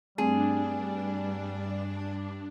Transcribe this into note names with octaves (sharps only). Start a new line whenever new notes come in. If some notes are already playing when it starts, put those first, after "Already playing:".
G2 G3 A3 C4 D4 G#4